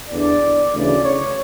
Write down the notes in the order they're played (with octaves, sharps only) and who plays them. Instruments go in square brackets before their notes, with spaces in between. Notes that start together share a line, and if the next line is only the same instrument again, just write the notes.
[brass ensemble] E2 D3 D5
D2 C#3 E3 D5
C#5